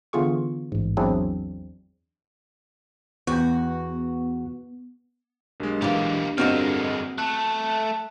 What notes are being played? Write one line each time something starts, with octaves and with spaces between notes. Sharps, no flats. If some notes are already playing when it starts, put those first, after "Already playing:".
D3 E3 B3 F4 G#4 C#6
A1 G#2
E2 F#3 C4 D4 E4 G#4
E2 B3 F#4 G5
B1 G#3 D4 G4 A#4
A#2 E3 G3 A#3
G2 D3 G#3 A#3 C4 F#4 D#5 F6
A3 A5 F#6